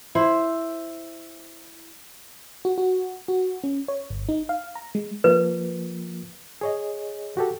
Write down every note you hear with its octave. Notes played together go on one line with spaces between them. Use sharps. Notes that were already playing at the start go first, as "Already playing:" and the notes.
E4 C5
F#4
F#4
F#4
C#4
C#5
G1
D#4
F5
A#5
G#3
F3 A#3 B4
G#4 C#5 D#5
F#4 G4 A4